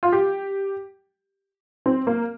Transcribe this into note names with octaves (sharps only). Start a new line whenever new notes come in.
F4
G4
C4
A#3